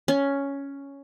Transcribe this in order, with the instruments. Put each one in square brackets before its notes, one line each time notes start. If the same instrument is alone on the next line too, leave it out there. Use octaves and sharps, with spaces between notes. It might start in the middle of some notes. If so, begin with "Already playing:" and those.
[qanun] C#4